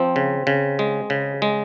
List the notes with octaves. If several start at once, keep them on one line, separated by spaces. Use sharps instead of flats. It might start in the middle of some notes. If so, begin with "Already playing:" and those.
Already playing: F3 C4
C#3
C#3
G#3
C#3
G#3